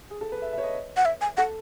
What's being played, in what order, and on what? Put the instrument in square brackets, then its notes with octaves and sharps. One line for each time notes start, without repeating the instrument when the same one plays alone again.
[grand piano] G#4
A4
B4
E5
E5
C#5
D#5
[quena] F#5
E5
G#5
[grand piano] A4 [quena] F#5